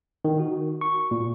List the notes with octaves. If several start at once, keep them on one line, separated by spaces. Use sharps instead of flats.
D#3
F#4
C#6
A#2